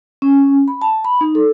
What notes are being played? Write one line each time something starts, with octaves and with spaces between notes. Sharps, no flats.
C#4
B5
A5
B5
D#4
A4